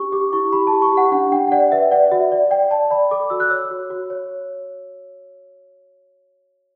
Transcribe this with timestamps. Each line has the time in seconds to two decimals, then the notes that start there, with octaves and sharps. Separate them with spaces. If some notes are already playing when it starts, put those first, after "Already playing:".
Already playing: D4 G4 C#6
0.12 G4 D6
0.33 E4 C#6
0.53 G4 B5
0.67 A5
0.72 G4
0.82 C#6
0.92 G4 F#5
1.12 D4 F#5
1.32 D4 G5
1.47 G5
1.52 D5 F#5
1.72 B4 E5
1.91 D5 F#5
2.12 F#4 E5
2.32 D5
2.51 D5 G5
2.71 D5 A5
2.91 D5 B5
3.11 A4 D6
3.30 F#4 E6
3.40 F#6
3.50 C#5 E6
3.71 F#4
3.90 F#4
4.10 C#5